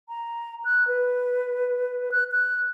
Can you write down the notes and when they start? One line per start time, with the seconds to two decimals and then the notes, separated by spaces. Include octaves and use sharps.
0.09 A#5
0.65 F#6
0.88 B4
2.12 F#6
2.32 F#6